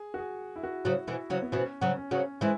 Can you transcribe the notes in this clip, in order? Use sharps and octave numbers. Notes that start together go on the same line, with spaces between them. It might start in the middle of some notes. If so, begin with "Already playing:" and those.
Already playing: G#4
F#4
G#4
E4
F#4
C#3 F#3
B2 E3 E4
C#3 F#3
B3
B2 E3 C#4
C#3 F#3
C#4
C#3 F#3
E3 G#3 E4